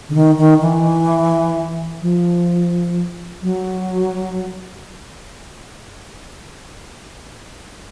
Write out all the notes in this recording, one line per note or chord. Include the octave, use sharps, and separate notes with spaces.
D3
D#3
D#3
E3
F3
F#3